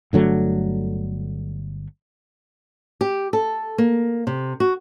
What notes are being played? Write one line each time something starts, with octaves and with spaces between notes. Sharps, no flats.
G1 D3 F#3 A3
G4
A4
A#3
C3
F#4